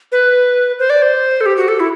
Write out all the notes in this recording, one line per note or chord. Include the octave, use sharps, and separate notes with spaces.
B4
C5
D5
C5
A4
G4
F#4
A4
E4